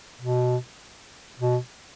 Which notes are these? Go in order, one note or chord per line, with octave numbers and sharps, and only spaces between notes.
B2
B2